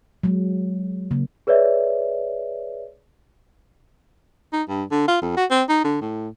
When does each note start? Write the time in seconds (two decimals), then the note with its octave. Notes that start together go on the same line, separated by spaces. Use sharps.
0.24 F#3 G#3
1.11 C#3 A#3
1.47 G#4 B4 C#5 D5 E5
4.53 D#4
4.69 G2
4.91 D3
5.08 F4
5.22 F2
5.37 F#4
5.51 C4
5.69 D#4
5.84 D3
6.01 A2